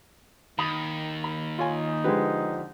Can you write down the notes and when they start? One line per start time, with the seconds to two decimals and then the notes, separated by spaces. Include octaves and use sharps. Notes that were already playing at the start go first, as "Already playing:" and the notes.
0.59 D#2 B5 D#6
1.24 B5
1.59 D#4 F4 C#5 G#5
2.04 D3 F3 G#3 G4 B4